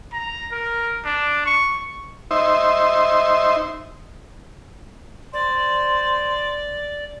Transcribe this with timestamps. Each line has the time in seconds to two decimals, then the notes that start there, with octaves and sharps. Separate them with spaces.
0.13 A#5
0.51 A#4
1.05 D4
1.46 C#6
2.31 D#4 C5 E5
5.33 C5 D5